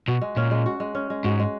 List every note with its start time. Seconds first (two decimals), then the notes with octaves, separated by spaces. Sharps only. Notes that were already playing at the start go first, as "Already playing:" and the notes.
0.08 B2 F#4
0.21 G#3
0.37 A#2 C#4
0.51 G#3
0.66 F#4
0.80 G#3
0.95 C#4
1.10 G#3
1.24 G#2 F#4
1.39 G#3